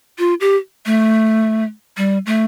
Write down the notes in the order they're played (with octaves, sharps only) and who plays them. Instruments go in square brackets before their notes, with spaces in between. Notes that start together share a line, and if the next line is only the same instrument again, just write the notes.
[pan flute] F4
G4
A3
G3
A3